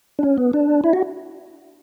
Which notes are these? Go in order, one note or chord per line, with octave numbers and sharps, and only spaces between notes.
D4
C#4
B3
D4
E4
F#4